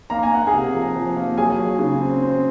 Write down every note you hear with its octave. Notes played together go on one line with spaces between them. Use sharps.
A#3 A#5
G#5
A#3 F#5
G#4 G#5
C3
F3
F3
A#3
F#3 G#4 G#5
F#3
C#3
C4
C4